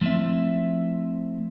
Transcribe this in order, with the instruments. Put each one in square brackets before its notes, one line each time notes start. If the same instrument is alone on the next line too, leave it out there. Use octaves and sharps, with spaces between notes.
[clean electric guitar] F3 A3 C4 E4 E5